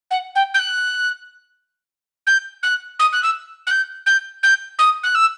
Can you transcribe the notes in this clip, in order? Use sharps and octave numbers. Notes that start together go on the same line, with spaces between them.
F#5
G5
G6
F#6
G6
F#6
D#6
F#6
E6
F#6
G6
G6
G6
D#6
F#6
E6